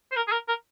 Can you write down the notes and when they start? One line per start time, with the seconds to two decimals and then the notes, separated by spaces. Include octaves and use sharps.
0.12 C5
0.16 A#4
0.28 G#4
0.32 A#4
0.48 A#4